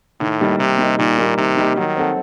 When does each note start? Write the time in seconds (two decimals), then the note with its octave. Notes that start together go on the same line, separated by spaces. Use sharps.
0.20 A2 D#3
0.40 G3 A#3 D#4 G4
0.59 C3 D#3
0.79 G3 A#3 D#4 G4
0.99 A#2 D#3
1.18 G3 A#3 D#4 G4
1.37 C3 D#3
1.57 G3 A#3 D#4 G4
1.76 D#3 F#3
1.96 C4 D#4 F#4 A4